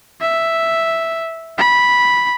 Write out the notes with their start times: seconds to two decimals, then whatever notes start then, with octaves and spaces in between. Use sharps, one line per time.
0.21 E5
1.58 B5